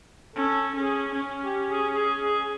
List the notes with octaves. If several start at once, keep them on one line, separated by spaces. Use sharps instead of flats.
C#4 A4
C#4 G#4
C#4
G4
G#4
G#4
G#4